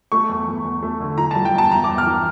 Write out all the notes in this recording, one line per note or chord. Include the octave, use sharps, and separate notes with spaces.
A3 C#6
E2
E2
E2
A3
D3
E3 A#5
G3 A5
G5
E2 A5
E2 A#5
D6
E2
F6
E3